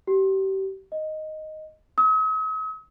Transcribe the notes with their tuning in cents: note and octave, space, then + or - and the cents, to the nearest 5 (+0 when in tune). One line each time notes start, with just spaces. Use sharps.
G4 -30
D#5 +0
D#6 +45